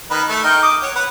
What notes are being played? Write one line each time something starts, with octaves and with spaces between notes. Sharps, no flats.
D#3 B4
A3
D#4 A#4 G5
D6 D#6
C#5 F#5
B4 F#5